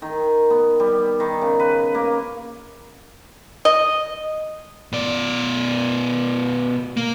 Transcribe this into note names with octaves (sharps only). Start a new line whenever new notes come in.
D#3
B3
G3
D#3
C#3
B4
A#3
D#5
B2 D5
A#3